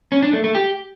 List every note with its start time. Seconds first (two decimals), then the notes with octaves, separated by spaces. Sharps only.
0.12 C#4
0.22 D4
0.33 A3
0.44 A3
0.55 G4